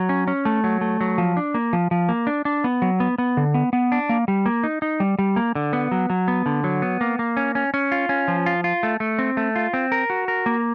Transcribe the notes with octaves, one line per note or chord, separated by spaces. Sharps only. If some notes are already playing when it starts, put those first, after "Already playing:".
Already playing: F#3
C#4
C#4
A3
F#3
A3
F#3
F3
D4
A#3
F3
F3
A#3
D4
D4
B3
F#3
B3
B3
D3
B3
B3
D4
A#3
G3
A#3
D#4
D#4
G3
G3
A#3
D3
B3
F#3
F#3
B3
D3
F#3
B3
A#3
A#3
C#4
C#4
C#4
F4
C#4
F3
F4
F4
A3
A3
C4
A3
F4
C4
A#4
F#4
A#4
A#3